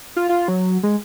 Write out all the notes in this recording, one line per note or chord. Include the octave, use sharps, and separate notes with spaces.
F4
F4
F#3
G#3